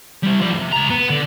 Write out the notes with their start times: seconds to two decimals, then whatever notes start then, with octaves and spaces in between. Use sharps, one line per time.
0.23 G3 C4
0.40 F3 D5
0.53 G#2 C3
0.72 C#2 A#5
0.90 B3
1.10 D3